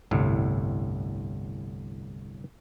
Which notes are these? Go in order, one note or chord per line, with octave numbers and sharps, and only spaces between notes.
G1 C2 A2